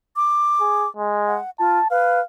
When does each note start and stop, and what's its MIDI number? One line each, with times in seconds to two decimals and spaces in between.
0.16 0.88 86
0.61 0.85 68
0.97 1.38 56
1.27 1.50 78
1.59 1.79 65
1.59 1.86 81
1.91 2.20 71
1.91 2.22 77